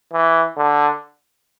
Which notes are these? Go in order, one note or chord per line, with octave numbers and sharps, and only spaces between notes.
E3
D3